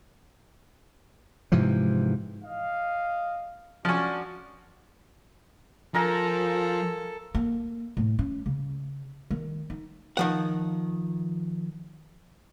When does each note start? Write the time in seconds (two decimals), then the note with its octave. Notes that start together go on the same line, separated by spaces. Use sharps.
1.52 G#2 C3 E3 F3
2.44 D#5 F5
3.85 F3 C#4 D4 F#4 D5
5.94 F3 A4 A#4 G#5 A#5
7.35 A#3
7.97 A2
8.19 C#4
8.46 C#3
9.31 D#3
9.70 D#4
10.17 D#3 F3 F#5